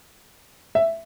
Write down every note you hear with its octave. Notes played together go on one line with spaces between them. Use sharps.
E5